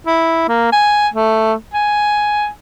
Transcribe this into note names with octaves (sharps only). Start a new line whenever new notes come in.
E4
A#3
G#5
A3
G#5